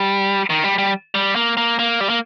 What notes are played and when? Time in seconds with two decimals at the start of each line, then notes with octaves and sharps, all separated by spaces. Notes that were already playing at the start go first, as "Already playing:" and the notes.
Already playing: G3
0.50 D#3
0.64 G3
0.78 G3
1.15 G3
1.36 A#3
1.57 A#3
1.79 A#3
2.01 G3
2.10 A#3